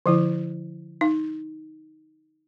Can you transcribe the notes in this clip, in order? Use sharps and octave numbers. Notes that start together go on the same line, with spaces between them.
D3 F3 E4
D#4